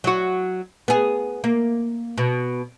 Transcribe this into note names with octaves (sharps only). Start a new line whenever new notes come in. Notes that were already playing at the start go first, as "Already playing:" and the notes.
F#3 F#4
B3 G#4
A#3
B2